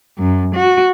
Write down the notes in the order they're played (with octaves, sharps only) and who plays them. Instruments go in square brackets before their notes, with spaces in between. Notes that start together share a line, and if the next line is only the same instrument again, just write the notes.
[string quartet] F#2
F#4